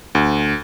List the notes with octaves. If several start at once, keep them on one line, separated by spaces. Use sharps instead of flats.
D2